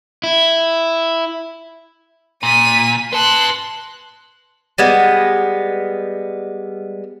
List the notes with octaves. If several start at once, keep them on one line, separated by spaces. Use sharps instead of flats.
E4
A#2 B6 D#7
B4 A5 C6 F#6
G3 G#3 B3